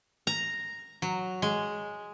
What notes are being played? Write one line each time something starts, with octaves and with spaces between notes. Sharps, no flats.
A#5
F#3
G#3